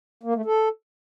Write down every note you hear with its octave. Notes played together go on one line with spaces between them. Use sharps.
A#3
A3
A4